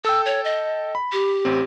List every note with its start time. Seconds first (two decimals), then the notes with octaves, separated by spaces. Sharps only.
0.05 A4 G5 E6
0.26 C#5
0.44 D#5
0.95 B5
1.13 G4
1.45 A1 C4